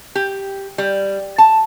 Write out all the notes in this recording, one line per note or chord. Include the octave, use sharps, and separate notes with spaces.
G4
G3
A5